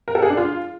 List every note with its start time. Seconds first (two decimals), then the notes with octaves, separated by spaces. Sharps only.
0.08 A#4
0.15 A4
0.22 G#4
0.30 D4
0.37 F4